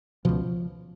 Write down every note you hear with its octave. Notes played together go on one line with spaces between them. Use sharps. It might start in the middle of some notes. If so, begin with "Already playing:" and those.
C#2 B2 F3